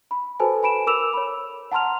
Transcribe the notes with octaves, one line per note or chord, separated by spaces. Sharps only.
B5
F#4 A4 B4 C5 G#5 A5
G#5 B5 D7 E7
A#4 D6 E6 E7 F7
C#5 B5
F#5 A5 A#5 C6 F6 F7